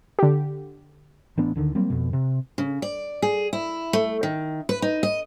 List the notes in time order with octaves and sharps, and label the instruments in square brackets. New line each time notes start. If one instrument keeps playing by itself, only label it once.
[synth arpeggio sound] D3 G4
[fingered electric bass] A1 B3 D4
D2 D3 D#3
F#3 G3 A#3 C4
F2 B2
C3
[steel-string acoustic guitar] C#3
D5
G#4
E4
A3
D#3
B4
D#4
D#5